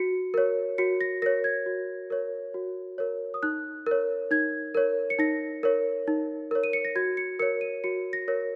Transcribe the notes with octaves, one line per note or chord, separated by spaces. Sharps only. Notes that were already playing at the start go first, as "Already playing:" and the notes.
Already playing: F#4 C#7
A#4 C#5
F#4 C#7
A#6
A#4 C#5 A#6
G#6
F#4
A#4 C#5
F#4
A#4 C#5
D#6
D#4 F#6
A#4 C#5
D#4 G#6
A#4 C#5
C#7
D#4 A#6
A#4 C#5
D#4
A#4 C#5
D#7
C#7
A#6
F#4 G#6
C#7
A#4 C#5 C#7
D#7
F#4 C#7
A#6
A#4 C#5